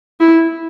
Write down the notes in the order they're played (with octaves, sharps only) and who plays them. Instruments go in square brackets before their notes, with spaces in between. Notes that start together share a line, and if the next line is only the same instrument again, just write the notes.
[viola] E4